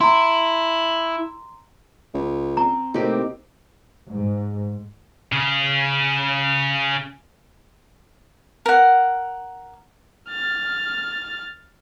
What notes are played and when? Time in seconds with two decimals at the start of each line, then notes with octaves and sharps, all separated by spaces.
0.01 E4 A#5 C6
2.14 C#2
2.57 C4 A#5
2.94 A2 C3 A#3 C4 D#4 G4
4.10 G#2
5.32 C#3 G#4
8.66 A#4 F#5
10.29 F6 A6